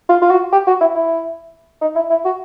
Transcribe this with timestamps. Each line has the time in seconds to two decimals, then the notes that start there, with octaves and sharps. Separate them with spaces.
0.09 F4
0.22 F4
0.30 F#4
0.52 G4
0.67 F#4
0.81 E4
0.95 E4
1.81 D#4
1.95 E4
2.10 E4
2.25 F#4